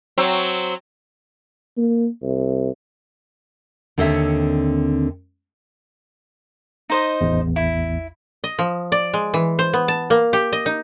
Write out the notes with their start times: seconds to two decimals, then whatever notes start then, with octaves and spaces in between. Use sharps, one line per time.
0.18 F#3 C4
1.77 A#3
2.23 C2
3.98 D#2 D3 C4 A4 C#5 E5
6.90 D#4 C5 D#5
7.21 A1 E2
7.56 E4
8.44 D#5
8.59 F3
8.92 D5
9.13 G#3
9.34 E3
9.59 C5
9.73 B3
9.88 A5
10.10 A#3
10.33 G4
10.53 D#5
10.66 D#4